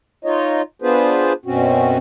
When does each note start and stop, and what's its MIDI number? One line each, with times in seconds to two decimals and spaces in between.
0.25 0.62 63
0.25 0.62 65
0.25 0.62 73
0.25 0.62 75
0.82 1.33 59
0.82 1.33 62
0.82 1.33 65
0.82 1.33 68
0.82 1.33 71
0.82 1.33 72
1.46 1.98 42
1.46 1.98 47
1.46 1.98 60
1.46 1.98 61
1.46 1.98 66